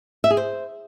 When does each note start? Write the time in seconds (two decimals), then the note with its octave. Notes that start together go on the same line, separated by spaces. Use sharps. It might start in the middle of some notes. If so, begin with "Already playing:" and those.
0.24 E5
0.30 G#4
0.37 C5